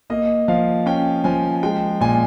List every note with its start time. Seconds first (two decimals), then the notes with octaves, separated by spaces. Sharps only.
0.10 A#3 D#5
0.48 F3 F5
0.86 C#4 G5
1.24 F3 G#5
1.63 G#3 G5
2.01 A#2 G#5